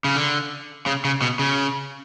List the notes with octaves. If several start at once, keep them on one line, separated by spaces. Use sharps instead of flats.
C#3
D3
C#3
C#3
B2
C#3